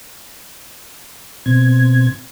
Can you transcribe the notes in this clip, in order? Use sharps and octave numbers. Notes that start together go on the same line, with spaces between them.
B2 C4 G#6